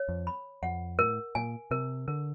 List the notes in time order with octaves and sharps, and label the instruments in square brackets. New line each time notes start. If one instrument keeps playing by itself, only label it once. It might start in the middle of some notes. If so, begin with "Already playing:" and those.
Already playing: [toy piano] C#5
[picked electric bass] F2
[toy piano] B5
[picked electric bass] F2 [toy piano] F#5
[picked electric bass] A2 [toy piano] A#4
[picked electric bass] A#2 [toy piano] G#5
[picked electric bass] C3 [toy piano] A#4
[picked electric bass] D3 [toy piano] A#4